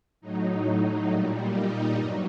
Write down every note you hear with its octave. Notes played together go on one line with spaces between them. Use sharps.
A2 F#3 D#4
A#2 G3
D#4
G2 F#3